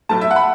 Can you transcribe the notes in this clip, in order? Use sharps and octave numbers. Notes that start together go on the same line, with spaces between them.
B1 A2 A3 A5
E5
F#5
B5